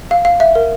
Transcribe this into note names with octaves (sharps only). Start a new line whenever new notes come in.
F5
F5
E5
A#4